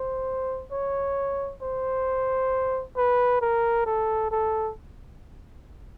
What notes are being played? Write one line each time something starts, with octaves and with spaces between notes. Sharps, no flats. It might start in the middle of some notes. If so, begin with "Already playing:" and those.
Already playing: C5
C#5
C5
B4
A#4
A4
A4